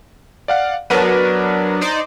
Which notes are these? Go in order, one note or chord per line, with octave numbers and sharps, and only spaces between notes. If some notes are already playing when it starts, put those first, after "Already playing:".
D5 F5 F#5
F#3 B3 D4 A#4 B4 D#7
D#4 C5 D5